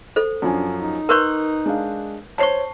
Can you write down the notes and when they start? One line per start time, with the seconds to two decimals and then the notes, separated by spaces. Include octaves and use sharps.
0.16 A4 C5
0.42 F#2 F3 D4 G#5
0.79 D#4
1.09 A#4 B4 C6 C#6 F#6 G6
1.66 G#3 D4 F5
2.38 C5 C#5 A5 C#6 C7